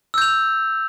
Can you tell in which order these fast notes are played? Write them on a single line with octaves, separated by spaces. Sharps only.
E6 G6 F7